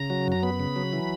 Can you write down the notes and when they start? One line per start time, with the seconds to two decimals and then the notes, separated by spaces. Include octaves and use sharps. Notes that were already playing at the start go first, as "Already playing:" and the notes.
Already playing: C#3 A#5
0.10 F#3
0.27 F#2 A#5
0.43 B3 B5
0.60 C#3
0.76 F#3
0.93 E3